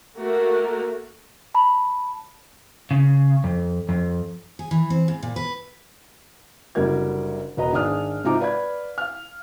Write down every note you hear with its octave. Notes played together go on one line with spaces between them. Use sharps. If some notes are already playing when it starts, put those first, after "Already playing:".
A3 A#3 F#4 A#4
A5 B5
C#3
F2
F2
G#4
E3
C4
G#2
A#2
B4
F#1 D3 G3 F#4 A#4 G#6
E1 F#4 B4 D#5 A#5
G#1 D4 G#4 D#6 F6 F#6
G#2 C3 D#4 F4 A#5 D6
B4 D5 F5 B5 G#6
F5 F6